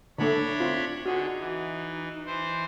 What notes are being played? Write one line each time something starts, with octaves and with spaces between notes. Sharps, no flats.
D3 A3 D4 C#5 B5
C4 F4
D3 D#4 F#4 G#4
E3
E3 C5